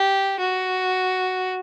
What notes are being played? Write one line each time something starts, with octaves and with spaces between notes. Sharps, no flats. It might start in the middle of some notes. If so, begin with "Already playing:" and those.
Already playing: G4
F#4